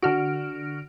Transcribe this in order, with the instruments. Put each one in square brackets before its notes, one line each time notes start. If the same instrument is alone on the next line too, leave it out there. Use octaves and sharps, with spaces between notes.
[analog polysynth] D3 F6 D7 [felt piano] F#4